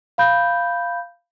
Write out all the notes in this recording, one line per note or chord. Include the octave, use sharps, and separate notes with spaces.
F5 B5 G6